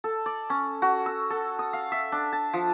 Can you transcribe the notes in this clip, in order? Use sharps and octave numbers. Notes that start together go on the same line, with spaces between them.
A4
D5
C#4
F#4
E6
A4
D#6
F5
E5
D4
A5
F3